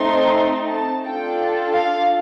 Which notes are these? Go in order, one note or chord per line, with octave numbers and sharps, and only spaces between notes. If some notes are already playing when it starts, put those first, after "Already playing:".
Already playing: A3 C4 D#4 C6
A5
D4 F4 A4 G5
F5